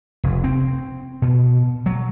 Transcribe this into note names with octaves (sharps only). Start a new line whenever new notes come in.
F1
C4
B2
F#3